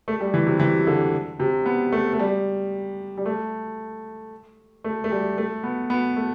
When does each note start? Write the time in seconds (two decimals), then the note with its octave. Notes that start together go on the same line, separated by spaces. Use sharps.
0.08 A3
0.20 G3
0.34 E3
0.47 C3
0.60 E3
0.87 D3
1.40 C3
1.66 B3
1.92 A3
2.13 A3
2.19 G3
3.18 G3
3.26 A3
4.84 A3
5.04 A3
5.12 G3
5.38 A3
5.63 B3
5.90 B3
6.17 A3